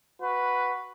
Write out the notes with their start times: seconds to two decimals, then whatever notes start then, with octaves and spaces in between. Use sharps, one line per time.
0.21 F#4 B4